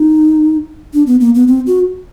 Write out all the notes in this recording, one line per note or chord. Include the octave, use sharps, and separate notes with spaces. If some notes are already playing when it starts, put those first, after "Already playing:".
Already playing: D#4
D4
B3
A#3
B3
C4
F#4